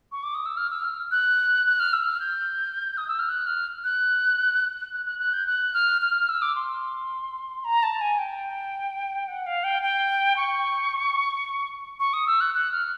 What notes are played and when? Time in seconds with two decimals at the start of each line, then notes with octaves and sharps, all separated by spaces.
0.12 C#6
0.23 D6
0.35 D#6
0.46 E6
0.57 F6
0.70 E6
0.84 F6
1.12 F#6
1.66 F#6
1.79 F6
1.93 E6
2.06 F6
2.20 G6
2.97 D#6
3.08 E6
3.19 F6
3.29 F#6
3.47 F6
3.84 F#6
4.92 F#6
5.06 F#6
5.19 F#6
5.33 G6
5.47 F#6
5.74 F6
6.02 F6
6.15 F6
6.29 E6
6.42 D6
6.56 C6
7.64 A#5
7.83 A5
8.01 G#5
8.19 G5
9.28 F#5
9.46 F5
9.64 G5
9.83 G5
10.37 C#6
12.00 C#6
12.13 D#6
12.27 E6
12.41 F#6
12.54 F#6
12.72 F6